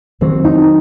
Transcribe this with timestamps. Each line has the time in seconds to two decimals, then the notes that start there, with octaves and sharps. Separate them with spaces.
0.21 D#3 F#3 C4
0.45 D#4